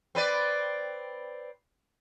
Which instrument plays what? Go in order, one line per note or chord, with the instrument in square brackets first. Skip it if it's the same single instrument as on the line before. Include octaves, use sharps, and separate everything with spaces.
[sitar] C4 B4 D5